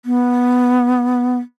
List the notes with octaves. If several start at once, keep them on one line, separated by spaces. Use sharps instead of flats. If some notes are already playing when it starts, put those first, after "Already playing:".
B3